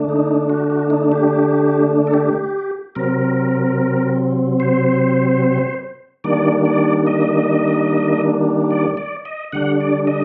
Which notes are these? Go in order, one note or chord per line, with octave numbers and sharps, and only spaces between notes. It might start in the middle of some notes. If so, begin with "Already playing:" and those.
Already playing: D3 A3 D4
D#4
F#4
F#4
D#4
G4
A4
G4
C3 F#3 C4 A#4
C5
D#3 G3 A#3 D4 D5
D5
D#5
D5
D5
D#5
D3 G3 D4 F#5
D5
D#5